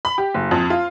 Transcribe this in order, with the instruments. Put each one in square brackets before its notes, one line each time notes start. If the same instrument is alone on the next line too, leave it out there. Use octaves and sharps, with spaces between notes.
[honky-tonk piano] B5
G4
F#1
F2
F4